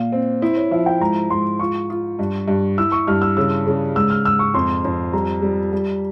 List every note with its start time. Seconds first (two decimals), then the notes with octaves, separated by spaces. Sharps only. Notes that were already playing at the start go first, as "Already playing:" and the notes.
Already playing: A#2 F5
0.12 C4
0.42 E4 C5
0.57 C#5
0.71 F3 E5
0.86 G5
1.00 G#2 A#5
1.30 G#2 C6
1.59 F4 C#6
1.90 F4
2.19 G2
2.48 G2
2.78 E4 E6
2.92 C#6
3.07 G2 F6
3.22 E6
3.37 C#3 E6
3.67 C#3
3.95 G#2 E6
4.10 F6
4.25 G#2 E6
4.39 C#6
4.54 F2 C6
4.85 F2
5.13 G3 A#5
5.42 G3
5.73 G3